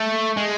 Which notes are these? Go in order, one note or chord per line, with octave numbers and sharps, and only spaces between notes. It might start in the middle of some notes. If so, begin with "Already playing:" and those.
Already playing: A3
G#3